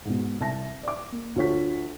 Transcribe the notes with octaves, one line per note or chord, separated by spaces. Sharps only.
G#2 B2
C2 E5 A5 A#6
D5 D6
A#3
D2 F4 C#5 C#6 B6